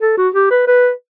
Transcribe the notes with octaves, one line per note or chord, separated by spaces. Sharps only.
A4
F#4
G4
B4
B4